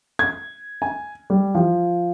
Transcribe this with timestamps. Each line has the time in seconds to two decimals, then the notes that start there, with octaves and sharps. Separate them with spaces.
0.19 G#6
0.82 G#5
1.30 G3
1.55 F3